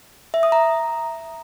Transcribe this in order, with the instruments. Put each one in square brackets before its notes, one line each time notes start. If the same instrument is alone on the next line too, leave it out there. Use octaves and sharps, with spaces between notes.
[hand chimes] E5
D#6
A#5